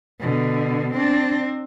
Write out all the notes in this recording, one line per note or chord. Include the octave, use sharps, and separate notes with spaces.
B2 D3
C4 D4